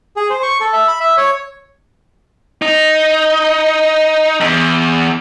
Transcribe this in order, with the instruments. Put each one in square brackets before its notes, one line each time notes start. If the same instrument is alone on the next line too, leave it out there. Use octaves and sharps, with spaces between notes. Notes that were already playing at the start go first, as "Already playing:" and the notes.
[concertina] G#4
C5
C#6
A4
E5
B5
E5
C#5
[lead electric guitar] D#4
E2